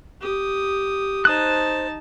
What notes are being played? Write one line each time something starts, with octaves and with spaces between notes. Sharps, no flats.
G4 D#6
D#4 C5 A5 D#6 F#6